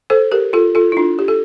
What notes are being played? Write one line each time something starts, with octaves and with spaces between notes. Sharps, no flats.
A4 C5
G4 A#4
F4 A4
F4 A4
E4
D4 F4
G4
A4